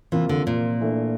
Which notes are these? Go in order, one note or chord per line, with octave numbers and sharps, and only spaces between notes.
C3 E3 F3 A#3 F4
D3
A#2
E3 A3 D4